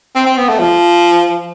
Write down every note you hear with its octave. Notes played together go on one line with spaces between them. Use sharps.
C4
C4
B3
A3
F3